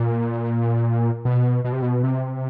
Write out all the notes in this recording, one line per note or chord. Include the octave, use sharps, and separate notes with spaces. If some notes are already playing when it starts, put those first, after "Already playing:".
Already playing: A#2
B2
B2
C3
B2
C3